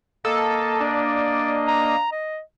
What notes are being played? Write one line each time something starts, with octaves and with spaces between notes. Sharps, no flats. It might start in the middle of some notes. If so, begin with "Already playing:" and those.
A#3 A4 D#5
D4 D5
A#5
D#5